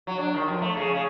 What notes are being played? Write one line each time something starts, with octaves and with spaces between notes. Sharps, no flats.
F#3
D4
D#3
F2
A3
C#3
C#3